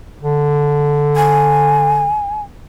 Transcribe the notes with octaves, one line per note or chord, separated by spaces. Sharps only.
D3
G#5